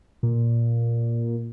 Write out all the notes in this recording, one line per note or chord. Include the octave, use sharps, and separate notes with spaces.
A#2